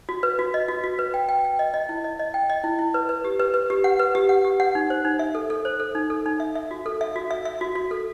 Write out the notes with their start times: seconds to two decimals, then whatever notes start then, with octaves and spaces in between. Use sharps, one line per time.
0.09 F#4
0.23 B4
0.39 F#4
0.54 D#5
0.68 F#4
0.84 F#4
0.99 B4
1.14 G5
1.29 G5
1.45 G5
1.59 D#5
1.74 D#5
1.89 E4
2.04 D#5
2.19 D#5
2.34 G5
2.50 D#5
2.64 E4
2.79 E4
2.94 B4
3.09 B4
3.24 G4
3.40 B4
3.54 B4
3.70 G4
3.84 F#5
3.99 B4
4.15 G4
4.29 F#5
4.45 G4
4.60 F#5
4.75 D#4
4.90 C5
5.05 D#4
5.19 E5
5.35 A4
5.50 A4
5.65 C5
5.80 A4
5.95 D#4
6.10 A4
6.26 D#4
6.40 E5
6.55 E5
6.71 F#4
6.86 A4
7.01 E5
7.16 F#4
7.31 E5
7.45 E5
7.61 F#4
7.75 F#4
7.91 A4